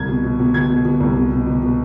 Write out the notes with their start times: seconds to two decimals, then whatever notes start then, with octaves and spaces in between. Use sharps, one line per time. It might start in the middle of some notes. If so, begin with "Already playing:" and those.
Already playing: C2 G#6
0.09 B2
0.24 B2
0.39 B2
0.54 B2 G#6
0.70 B2
0.85 B2
1.00 C2
1.16 B2
1.32 B2
1.46 B2
1.63 B2